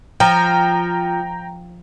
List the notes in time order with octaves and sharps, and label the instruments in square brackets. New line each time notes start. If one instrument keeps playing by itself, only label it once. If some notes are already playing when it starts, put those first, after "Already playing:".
[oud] F3 [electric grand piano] G5 A#5